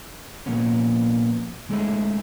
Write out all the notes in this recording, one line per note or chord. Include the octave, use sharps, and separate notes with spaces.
A#2 F3 A#3 B3 C#4
G#3 A3 C#4 D#4 E4 G#4